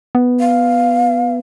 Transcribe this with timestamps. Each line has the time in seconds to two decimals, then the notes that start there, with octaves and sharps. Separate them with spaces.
0.15 B3
0.40 F5